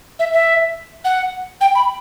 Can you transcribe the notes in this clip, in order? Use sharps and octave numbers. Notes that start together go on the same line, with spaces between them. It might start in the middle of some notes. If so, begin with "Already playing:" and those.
E5
E5
F#5
G5
B5